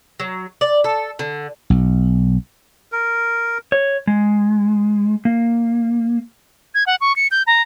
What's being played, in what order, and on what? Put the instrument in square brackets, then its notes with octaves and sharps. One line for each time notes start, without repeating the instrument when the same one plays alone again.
[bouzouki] F#3
D5
A4
D3
[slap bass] B1
[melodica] A#4
[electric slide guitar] C#5
G#3
A#3
[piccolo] G#6
F#5
C#6
C#7
G6
A#5